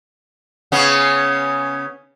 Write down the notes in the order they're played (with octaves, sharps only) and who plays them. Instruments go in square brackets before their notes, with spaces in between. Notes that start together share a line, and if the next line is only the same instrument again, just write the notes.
[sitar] C#3 B3 C#4